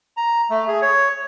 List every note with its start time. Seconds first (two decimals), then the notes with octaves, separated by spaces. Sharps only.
0.17 A#5
0.50 A3
0.68 G#4
0.82 C#5